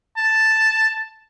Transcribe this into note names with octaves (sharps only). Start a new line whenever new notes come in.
A5